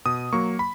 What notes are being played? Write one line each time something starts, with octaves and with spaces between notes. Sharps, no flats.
B2 D#6
F#3 A#3 C#6
B5